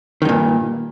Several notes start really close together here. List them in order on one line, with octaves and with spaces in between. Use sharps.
D#3 G2 A#2